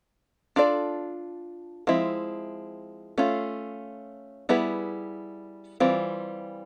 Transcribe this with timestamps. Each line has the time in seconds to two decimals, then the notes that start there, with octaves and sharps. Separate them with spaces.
0.56 D4 F4 A4 D5
1.87 F3 G#3 C4 E4
3.18 A3 C#4 F4
4.49 G3 B3 E4 G#4 B4
5.80 E3 G3 C4 F4